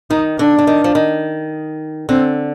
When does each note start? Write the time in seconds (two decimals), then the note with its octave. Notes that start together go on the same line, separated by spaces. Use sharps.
0.10 D#3 D#4
0.39 D3 D4
0.58 D3
0.67 D#3
0.84 F3
0.95 D#3
2.09 D3 C4